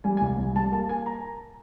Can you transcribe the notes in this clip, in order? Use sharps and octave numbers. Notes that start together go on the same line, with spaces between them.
G3 G#5
G#5
C2
C2
G3 A5
A#3 A5
A#3 G#5
A#5